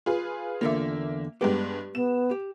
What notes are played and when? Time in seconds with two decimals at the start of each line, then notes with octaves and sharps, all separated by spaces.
0.06 F4 G#4 B4
0.61 E2 D3 A#3 F4 E5
1.41 G2 G#3 B3 G4 B4 G5
1.95 B3 E7
2.31 G4